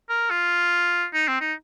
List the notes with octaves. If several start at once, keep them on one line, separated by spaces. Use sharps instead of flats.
A#4
F4
D#4
C4
D#4